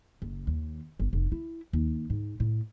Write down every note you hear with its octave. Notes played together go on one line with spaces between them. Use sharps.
F#1
D#2
G1
F1
E4
D#2
G#2
A2